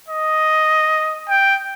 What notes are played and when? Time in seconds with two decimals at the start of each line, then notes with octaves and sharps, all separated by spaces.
0.08 D#5
1.29 G5